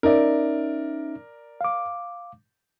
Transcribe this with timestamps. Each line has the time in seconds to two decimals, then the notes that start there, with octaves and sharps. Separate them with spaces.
0.03 C#4 D#4 A#4 D5 E5
1.61 F5 D6